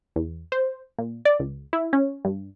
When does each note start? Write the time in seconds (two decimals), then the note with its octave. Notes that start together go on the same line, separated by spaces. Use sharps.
0.16 E2
0.52 C5
0.99 A#2
1.25 D5
1.40 C#2
1.73 E4
1.93 C#4
2.25 G2